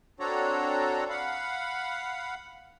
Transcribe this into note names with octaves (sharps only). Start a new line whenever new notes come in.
C4 D4 F#4 A4 C#5 A#5
F5 F#5 B5